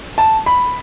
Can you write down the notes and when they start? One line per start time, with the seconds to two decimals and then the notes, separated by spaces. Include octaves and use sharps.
0.18 A5
0.46 B5